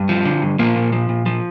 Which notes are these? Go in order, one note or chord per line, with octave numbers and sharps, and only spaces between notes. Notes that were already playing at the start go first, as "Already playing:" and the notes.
Already playing: G2
F3
D3
G2
A#2 F3 A#3
A#2
F3
A#2
F3